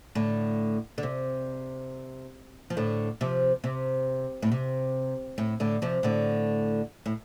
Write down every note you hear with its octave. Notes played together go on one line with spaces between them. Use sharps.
A2 D3
D3
C3
F3
A2 D3
C3 F3
C3
A2
C3
A2
A2 D3
C3 F3
A2 D3
A2